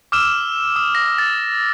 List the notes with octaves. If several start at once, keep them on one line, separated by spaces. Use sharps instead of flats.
D6 E6 F6 E7
D#6
A#6
A6